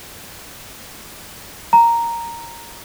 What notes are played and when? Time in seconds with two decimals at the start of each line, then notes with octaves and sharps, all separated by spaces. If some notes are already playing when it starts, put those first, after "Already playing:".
1.73 A#5